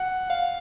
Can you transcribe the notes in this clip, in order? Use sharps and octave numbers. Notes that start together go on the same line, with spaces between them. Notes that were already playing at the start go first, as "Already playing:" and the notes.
Already playing: F#5
F5